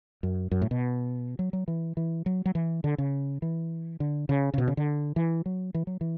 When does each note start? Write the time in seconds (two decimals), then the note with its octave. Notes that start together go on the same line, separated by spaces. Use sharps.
0.23 F#2
0.51 F#2
0.62 A2
0.71 B2
1.39 F#3
1.53 F#3
1.68 E3
1.97 E3
2.26 F#3
2.45 F#3
2.55 E3
2.84 D3
2.98 C#3
3.42 E3
4.00 D3
4.29 C#3
4.54 C#3
4.58 B2
4.68 C#3
4.77 D3
5.16 E3
5.46 F#3
5.74 E3
5.87 F#3
6.01 E3